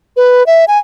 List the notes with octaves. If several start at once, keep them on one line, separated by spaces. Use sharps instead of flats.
B4
E5
G#5